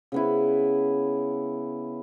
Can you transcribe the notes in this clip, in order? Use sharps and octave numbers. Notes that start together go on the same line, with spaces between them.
C#3 B3 E4